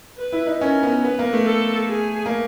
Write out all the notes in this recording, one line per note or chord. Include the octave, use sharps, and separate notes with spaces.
B4
E4
D#4
C#4 A#4
B3
B3 B4
A#3
A3
A4
G#4
A#3